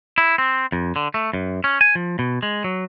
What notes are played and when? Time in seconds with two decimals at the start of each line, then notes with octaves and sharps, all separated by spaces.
0.18 E4
0.38 C4
0.72 F2
0.96 D3
1.14 A3
1.34 F#2
1.64 C#4
1.81 G#5
1.95 F3
2.19 B2
2.43 G#3
2.64 F#3